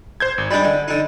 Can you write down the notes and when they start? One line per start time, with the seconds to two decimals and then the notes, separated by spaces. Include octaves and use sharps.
0.20 C5 G6 G#6
0.38 G#1
0.51 G3 G#3 D4 B5
0.65 D3
0.88 D3 D#4